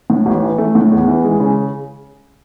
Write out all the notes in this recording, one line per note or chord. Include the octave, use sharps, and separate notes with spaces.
A2
A1
E3
A3
A2
E2
E3
G#3
C#3